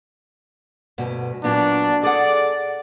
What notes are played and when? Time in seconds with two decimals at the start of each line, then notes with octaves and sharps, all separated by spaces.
0.98 D2 G2 B2
1.44 A#2 F#3 B3 D4
2.03 G#4 A4 D5 F#5